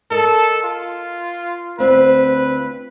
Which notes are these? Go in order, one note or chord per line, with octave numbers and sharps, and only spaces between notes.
A4 A#4 D#5
F4
D2 C4 F4 B4